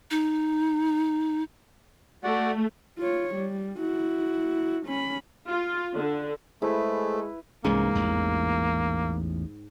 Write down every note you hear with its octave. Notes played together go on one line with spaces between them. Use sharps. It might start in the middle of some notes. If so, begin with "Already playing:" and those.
D#4
A3 F#4 D5 F#5
F4 C#5
G3
E4 F#4
C#4 B5
F4
D3
G#3 A3 E4 G#4 B4 C5
C2 G#2 E3 A#3 C#4
A1 E2